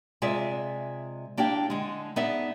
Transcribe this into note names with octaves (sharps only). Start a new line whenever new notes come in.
C3 G#3 F4 G#4 D5 E5
A#3 D4 E4 G4 G5
D3 G#3
B3 D#4 G#4 D5 E5